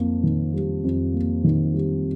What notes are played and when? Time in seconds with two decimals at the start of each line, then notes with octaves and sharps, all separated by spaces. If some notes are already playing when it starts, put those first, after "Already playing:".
Already playing: F2 A#3
0.23 D#3
0.54 G3
0.84 F2
1.14 A#3
1.44 D#3
1.74 G3